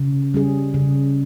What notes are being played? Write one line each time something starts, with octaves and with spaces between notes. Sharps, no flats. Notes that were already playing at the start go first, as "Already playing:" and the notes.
Already playing: C#3
G3 C#4 G#4
C#3